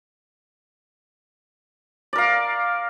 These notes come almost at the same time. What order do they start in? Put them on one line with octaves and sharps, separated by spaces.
D5 A#4 F5